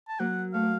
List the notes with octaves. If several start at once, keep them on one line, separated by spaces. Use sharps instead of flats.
A5
F#3 A#3 F#5
A3 F5
A#3